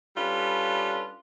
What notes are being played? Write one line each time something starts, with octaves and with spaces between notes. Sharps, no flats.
G3 C#4 D4 F4 A4 B4